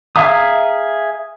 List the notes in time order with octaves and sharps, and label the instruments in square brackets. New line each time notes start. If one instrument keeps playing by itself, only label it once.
[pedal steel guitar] G#4 E5 F5 A#5 D#6